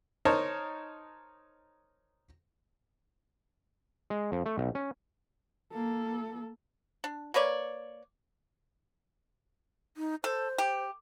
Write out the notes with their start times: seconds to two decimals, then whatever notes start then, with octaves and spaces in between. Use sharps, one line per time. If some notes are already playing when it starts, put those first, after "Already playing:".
0.25 D#4 A#4 C5 C#5 A5
4.10 G#3
4.32 F2
4.46 A3
4.58 B1
4.75 C#4
5.72 A#3 A4
7.04 D4
7.34 A#3 B4 C#5 D5
9.97 D#4
10.24 A4 C5
10.58 G4